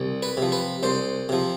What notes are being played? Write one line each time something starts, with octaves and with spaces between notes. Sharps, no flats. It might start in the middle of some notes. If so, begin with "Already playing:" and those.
Already playing: C2
B4
C3 F3
B4
C2 C5
C3 F3